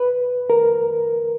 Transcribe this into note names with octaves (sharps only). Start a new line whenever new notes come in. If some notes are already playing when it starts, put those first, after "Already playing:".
Already playing: B4
A#4